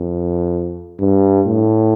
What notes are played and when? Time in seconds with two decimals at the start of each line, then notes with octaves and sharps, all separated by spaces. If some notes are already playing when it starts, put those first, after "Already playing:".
Already playing: F2
0.99 G2
1.47 A2